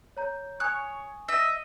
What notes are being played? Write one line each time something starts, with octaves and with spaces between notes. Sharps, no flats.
C#5 A#5 G6
C#5 G#5 C#6 D#6 F#6
D#5 E5